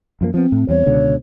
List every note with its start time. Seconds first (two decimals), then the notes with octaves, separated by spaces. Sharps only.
0.21 F#2 F3 A#3
0.34 F3 B3 C4
0.52 A2
0.69 E2 G3 C4 C#5
0.86 C#2 B2 D3